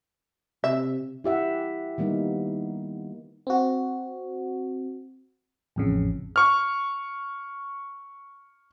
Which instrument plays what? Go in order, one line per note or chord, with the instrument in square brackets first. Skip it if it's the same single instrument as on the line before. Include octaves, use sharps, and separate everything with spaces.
[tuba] C3 [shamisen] E5
[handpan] E4 G4 E5 F#5
D#3 G3 A#3 B3 D#4
[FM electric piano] C4 F#4
A1 F2 C#3
[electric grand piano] C#6 F6